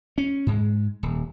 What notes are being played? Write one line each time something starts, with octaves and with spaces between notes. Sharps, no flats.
C#4
G#2 G#3
D#1